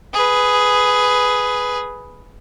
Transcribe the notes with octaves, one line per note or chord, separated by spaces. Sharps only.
G#4 B4